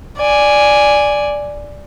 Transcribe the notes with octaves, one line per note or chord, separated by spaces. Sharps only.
D5 G#5